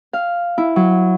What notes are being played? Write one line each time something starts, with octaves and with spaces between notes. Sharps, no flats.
F5
E4
F#3